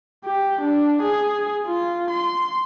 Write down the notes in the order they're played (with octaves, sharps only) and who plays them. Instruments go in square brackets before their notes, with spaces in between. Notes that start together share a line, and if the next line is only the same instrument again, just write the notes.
[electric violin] G4
D4
G#4
F4
C6